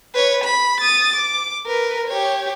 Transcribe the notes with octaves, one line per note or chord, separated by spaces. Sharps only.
B4 C#5
B5
D#6 A6
D6
A#4 B4
G4 C#5